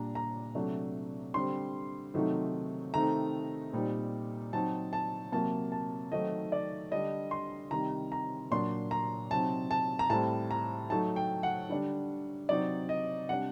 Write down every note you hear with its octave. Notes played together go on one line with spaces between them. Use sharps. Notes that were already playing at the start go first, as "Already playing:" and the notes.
Already playing: A#2 G3 D4 A#5
A#5
C3 F#3 A3 D4
D3 G3 C4 C6
C3 D#3 F#3 A3 D#4
C3 D#3 A3 C4 D#4 A#5
A#2 G3 C4 D#4
F#3 C4 D#4 A5
A5
C3 F#3 A#3 A5
A5
D#3 F#3 A3 C4 D#4 D#5
D5
D3 G3 D4 D#5
C6
C3 D#3 G3 A#5
A#5
A#2 F#3 A#3 D4 C6
A#5
C3 F#3 C4 D#4 A5
A5
A#5
A2 G3 C4 A5
A#5
F#3 A3 D#4 A5
G5
F#5
D3 G3 D4
C3 F#3 C4 D#4 D5
D#5
C3 G3 D4 F#5